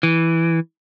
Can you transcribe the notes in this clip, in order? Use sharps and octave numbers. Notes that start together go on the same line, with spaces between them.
E3